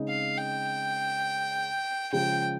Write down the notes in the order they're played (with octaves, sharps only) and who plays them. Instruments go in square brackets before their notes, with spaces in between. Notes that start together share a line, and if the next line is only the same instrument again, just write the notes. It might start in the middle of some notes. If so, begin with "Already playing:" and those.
Already playing: [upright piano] C#3 G#3 C4 D#4
[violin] F5
G5
[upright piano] C#3 F3 G#3 [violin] G5